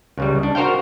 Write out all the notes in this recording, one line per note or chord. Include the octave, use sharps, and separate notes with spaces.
C#2 C#3 G3
D4
F#4 A#4 C5 F5 G5